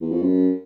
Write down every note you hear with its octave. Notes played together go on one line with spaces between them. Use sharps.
E2
F2
F#2